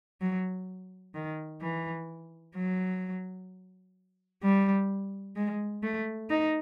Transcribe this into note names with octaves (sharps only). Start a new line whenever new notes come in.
F#3
D#3
E3
F#3
G3
G#3
A3
D#4